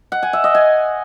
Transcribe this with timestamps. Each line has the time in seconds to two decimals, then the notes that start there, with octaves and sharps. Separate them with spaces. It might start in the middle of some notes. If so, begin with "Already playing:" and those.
0.12 F#5
0.23 G#5
0.33 E5
0.44 D#5
0.55 G#5